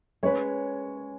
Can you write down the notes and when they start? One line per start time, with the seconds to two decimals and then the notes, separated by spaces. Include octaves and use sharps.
0.23 G#3 C#4 B4 C#5